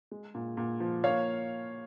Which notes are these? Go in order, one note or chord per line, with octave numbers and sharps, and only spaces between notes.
G#3
A#2
A#2
F3
A#3 C#5 F5